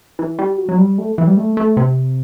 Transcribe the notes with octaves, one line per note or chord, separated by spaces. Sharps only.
E3
G3
F#3
F#3
G3
A3
E3
G3
A3
A3
C3